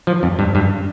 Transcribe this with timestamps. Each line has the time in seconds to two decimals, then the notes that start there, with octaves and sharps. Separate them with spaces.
0.07 F3
0.23 F2
0.39 G2
0.55 G2